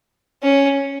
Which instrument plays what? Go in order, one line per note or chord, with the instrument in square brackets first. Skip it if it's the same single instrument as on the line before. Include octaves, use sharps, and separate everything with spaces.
[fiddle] C#4